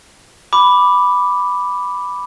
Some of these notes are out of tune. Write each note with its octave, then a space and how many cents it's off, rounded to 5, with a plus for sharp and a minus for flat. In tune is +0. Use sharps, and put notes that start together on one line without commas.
B5 +0 D6 +0